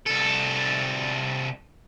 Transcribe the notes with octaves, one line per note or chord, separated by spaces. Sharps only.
C2 A4